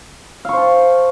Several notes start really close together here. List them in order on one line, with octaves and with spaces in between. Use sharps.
F5 C#6 C5 A5